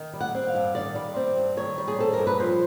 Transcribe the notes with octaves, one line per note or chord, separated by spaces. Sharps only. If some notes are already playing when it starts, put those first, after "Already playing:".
Already playing: D#3
G3
F#5
C4
F5
G2
D#3 D5
G3
C4
G2
D#3 C#5
G3
G#4
C4 A4
G2 A#4
B4
F3 C5